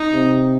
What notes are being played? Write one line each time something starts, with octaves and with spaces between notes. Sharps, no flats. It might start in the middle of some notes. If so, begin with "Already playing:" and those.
Already playing: D#4
C3